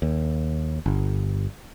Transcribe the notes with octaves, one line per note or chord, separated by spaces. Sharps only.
D#2
G1